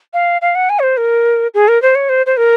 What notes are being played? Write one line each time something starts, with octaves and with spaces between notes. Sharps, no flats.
F5
F5
F#5
G#5
C#5
C5
A#4
G#4
A#4
C5
C#5
C5
C5
A#4